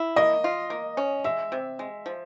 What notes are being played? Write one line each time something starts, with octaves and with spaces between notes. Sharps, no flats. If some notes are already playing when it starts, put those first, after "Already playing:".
Already playing: E4
A#3 D#5
F4
A#3
C#4
G#3 E5
C3
G#3
F3